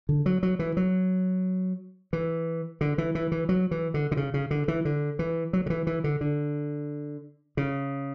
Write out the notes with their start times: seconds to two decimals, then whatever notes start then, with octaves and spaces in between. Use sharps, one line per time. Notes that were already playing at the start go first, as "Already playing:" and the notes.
0.09 D3
0.26 F#3
0.43 F#3
0.59 E3
0.77 F#3
2.13 E3
2.81 D3
2.98 E3
3.15 E3
3.32 E3
3.49 F#3
3.71 E3
3.94 D3
4.11 D3
4.17 C#3
4.34 C#3
4.51 D3
4.68 E3
4.85 D3
5.19 E3
5.53 F#3
5.66 D3
5.70 E3
5.87 E3
6.04 D3
6.21 D3
7.57 C#3